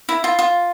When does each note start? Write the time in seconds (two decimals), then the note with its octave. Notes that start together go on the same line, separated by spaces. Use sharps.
0.09 E4
0.24 F4
0.39 F4